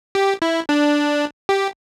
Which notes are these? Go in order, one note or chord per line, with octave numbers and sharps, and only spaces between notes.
G4
E4
D4
G4